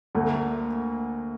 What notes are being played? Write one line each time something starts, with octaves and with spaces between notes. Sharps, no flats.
D2 D3 A3 A#3